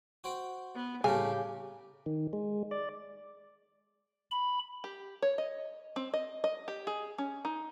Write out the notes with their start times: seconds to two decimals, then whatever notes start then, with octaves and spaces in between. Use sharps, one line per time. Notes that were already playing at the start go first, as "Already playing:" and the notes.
0.24 F#4 C5 G5
0.76 B3
1.04 C2 A2 C#3 A3 G4 G#5
2.06 D#3
2.33 G#3
2.71 D5
4.31 B5
4.84 G4
5.22 C#5
5.38 D#5
5.96 C4
6.14 D#5
6.44 D#5
6.68 G4
6.87 G#4
7.18 C#4
7.45 D#4